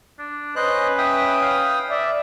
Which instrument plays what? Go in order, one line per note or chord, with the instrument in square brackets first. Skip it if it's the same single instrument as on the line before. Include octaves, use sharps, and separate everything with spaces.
[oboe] D4
[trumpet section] C#4 B4 [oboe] C5 [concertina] D#5 F#6
[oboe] E5 [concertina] G5 D#6
[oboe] F5
[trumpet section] D5 E5 [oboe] D6